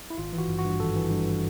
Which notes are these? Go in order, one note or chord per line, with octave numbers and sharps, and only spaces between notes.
E4
G#1 F4
E3
F#4
G2
F#4
G2
G#1 A4
E3
G2